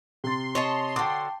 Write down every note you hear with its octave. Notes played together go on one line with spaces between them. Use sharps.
C3 C6 A6
C#5 D#5 A5
D3 F#4 G5 A5 D6